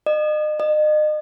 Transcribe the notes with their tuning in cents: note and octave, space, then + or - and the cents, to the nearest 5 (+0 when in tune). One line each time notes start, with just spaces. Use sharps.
D#5 -40
D#5 -35